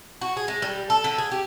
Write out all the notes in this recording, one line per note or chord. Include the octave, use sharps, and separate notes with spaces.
F#4
G#4
G#3
G3
A4
D3
G#4
G4